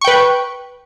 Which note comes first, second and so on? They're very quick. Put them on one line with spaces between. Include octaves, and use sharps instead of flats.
C#6 G5 B4